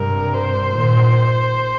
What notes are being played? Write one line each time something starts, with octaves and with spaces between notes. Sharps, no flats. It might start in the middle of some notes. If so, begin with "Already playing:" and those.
Already playing: G2 C3 A#4
C5
A#2 D#3